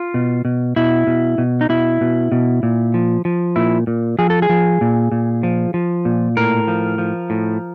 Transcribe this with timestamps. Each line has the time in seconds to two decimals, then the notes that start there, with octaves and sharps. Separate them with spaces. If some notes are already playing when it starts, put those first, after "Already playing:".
Already playing: F4
0.14 B2
0.45 B2
0.76 B2 E4
1.07 B2
1.38 B2
1.61 D#4
1.69 B2 E4
2.01 B2
2.32 B2
2.63 A#2
2.94 F3
3.25 F3
3.56 A#2 E4
3.87 A#2
4.19 F3 G#4
4.30 A4
4.42 G#4
4.49 F3
4.81 A#2
5.12 A#2
5.43 F3
5.74 F3
6.05 A#2
6.37 A2 A#4
6.68 F3
6.98 F3
7.30 A2